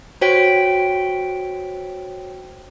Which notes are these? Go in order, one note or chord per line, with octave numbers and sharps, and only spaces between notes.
F#4 C5 C#5 G5 B6 D7